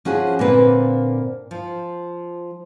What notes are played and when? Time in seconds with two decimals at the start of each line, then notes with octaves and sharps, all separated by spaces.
0.05 F3 C#4 F#4 G#4
0.39 A#2 D3 A#3 C4 B4
1.51 F3